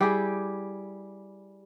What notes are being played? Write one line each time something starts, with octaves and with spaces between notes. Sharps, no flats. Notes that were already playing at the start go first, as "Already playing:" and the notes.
G3 E4 G4 G#4